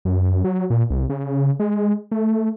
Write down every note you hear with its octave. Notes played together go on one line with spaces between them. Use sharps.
F#2
F#3
A#2
C2
C#3
G#3
A3